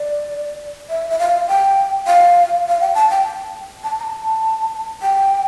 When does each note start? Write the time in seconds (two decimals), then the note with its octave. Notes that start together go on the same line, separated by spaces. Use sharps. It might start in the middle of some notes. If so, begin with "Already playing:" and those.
Already playing: D5
0.90 E5
1.10 E5
1.19 F5
1.48 G5
2.07 F5
2.68 F5
2.81 G5
2.95 A5
3.11 G5
3.84 A5
4.00 A#5
4.03 A5
5.02 G5